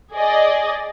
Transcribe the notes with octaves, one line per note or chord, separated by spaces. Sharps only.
G#4 D5 D#5